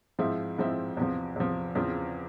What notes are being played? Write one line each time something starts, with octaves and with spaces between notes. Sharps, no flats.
G#2 F3 C4 E4
G#2 F3 C4 E4
E2 C3 F3
E2 C3 F3
E2 C#3 F3 C4 F4